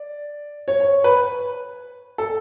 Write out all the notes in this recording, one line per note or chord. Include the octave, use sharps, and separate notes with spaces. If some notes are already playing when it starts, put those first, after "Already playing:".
Already playing: D5
C#5
C#5
B4
A4